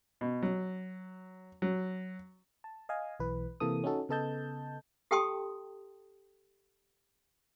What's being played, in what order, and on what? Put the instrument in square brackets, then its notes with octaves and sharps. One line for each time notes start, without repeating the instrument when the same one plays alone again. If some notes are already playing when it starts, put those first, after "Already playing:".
[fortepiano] B2
F#3
F#3
[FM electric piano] A5
D#5 F5 G#5
B1 E3 B4
C3 E3 A#3 A4 D#6
C#4 D#4 F#4 A4
C#3 B3 A4 D#5 A5 G6
[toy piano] G4 A4 G5 A5 C6 D#6